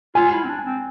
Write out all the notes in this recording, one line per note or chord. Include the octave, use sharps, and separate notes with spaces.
F4 G#5
E4
C4
D4
C4